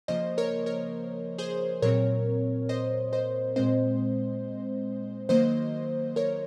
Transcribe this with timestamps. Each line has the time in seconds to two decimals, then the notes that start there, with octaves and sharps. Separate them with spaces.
0.08 C#3 F3 A#3 C5 D#5
0.38 A#4 C#5
0.66 A#4 C#5
1.38 G#4 C5
1.82 A#2 F#3 C4 A#4 C#5
2.69 C5 D#5
3.13 C5 D#5
3.56 A#2 G#3 C4 C5 D#5
5.29 D#3 F#3 A#3 C5 D#5
6.16 A#4 C#5